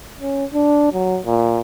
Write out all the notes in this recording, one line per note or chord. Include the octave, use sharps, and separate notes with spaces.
C#4
D4
F#3
A#2